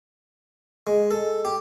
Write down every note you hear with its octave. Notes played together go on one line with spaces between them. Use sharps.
G#3
A4
G4